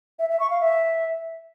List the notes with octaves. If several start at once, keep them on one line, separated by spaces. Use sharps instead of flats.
E5
E5
C#6
F5
E5